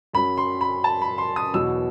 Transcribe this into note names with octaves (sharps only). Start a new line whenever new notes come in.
F#2 F#3 B5
C6
B5
A5
B5
C6
D#6
E2 B2 F#3 E6